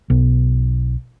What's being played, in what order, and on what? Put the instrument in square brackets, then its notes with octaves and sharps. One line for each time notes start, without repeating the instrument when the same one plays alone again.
[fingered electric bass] B1